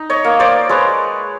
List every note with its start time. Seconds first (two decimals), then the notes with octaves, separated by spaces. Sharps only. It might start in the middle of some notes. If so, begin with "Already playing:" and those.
Already playing: D#4
0.10 C#5 D#5
0.24 A#3
0.39 C5 D5
0.69 G#3 B4 C#5